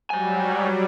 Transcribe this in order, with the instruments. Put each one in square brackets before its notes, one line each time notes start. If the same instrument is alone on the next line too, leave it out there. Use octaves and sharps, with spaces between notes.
[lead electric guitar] G#2 G#5 [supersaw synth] F#3 G3